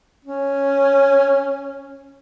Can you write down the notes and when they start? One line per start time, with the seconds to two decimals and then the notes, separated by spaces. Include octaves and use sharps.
0.25 C#4